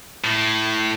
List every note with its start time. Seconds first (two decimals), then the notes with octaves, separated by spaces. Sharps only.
0.24 A2